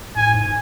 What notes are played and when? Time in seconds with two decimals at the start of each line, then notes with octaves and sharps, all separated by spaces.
0.16 A2 G#5
0.34 G#2